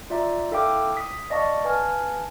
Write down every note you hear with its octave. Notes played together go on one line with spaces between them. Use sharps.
F4 D5 E5 A#5
E4 A4 E5 F5 G5 D6
D#6 B6
D5 D#5 F5 A5 C#6
B4 F5 G#5 A5 F6